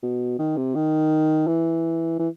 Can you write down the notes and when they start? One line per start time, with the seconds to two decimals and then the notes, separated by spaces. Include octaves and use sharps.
0.03 B2
0.39 D#3
0.57 C3
0.75 D#3
1.47 E3
2.19 E3